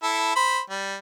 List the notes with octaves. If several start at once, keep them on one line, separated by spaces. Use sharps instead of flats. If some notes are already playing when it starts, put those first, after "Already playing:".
E4 A4
C5 B5
G3